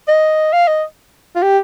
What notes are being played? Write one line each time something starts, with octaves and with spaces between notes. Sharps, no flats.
D#5
F5
D#5
F4
G4